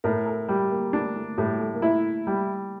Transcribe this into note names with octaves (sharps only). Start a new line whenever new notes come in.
A2 A#4
A4
G3 G4
A#3
A3 D4
A3
A2 G3
A3
A#3
A3 E4
G3